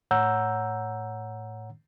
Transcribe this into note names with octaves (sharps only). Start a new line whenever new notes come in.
A2 C#5 F#5 A#5 E6 G6